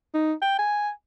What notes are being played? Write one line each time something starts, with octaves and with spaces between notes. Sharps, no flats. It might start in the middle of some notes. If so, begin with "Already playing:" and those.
D#4
G5
G#5